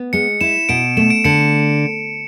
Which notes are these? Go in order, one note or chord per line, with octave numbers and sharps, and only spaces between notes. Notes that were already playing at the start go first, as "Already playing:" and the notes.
Already playing: B3
G#3 C#7
E4 E7
B2 D7
A3 E7
D7
D3 C#7